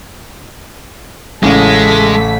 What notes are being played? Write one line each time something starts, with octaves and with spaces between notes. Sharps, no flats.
A1 A2 C#3 G#3 A4 B6